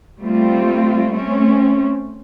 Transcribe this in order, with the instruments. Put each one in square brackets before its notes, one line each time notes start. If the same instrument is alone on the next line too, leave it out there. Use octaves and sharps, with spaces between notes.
[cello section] G3 A3 C4 F4
A3 C4 C#4